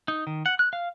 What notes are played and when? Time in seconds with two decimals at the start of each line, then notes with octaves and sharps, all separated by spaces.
0.08 D#4
0.27 D#3
0.46 F#5
0.59 F#6
0.73 F5